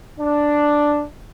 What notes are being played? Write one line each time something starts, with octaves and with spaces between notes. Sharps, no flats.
D4